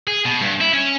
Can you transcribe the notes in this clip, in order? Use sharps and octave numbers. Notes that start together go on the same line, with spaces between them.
G#4
B2
G2
E4
C#4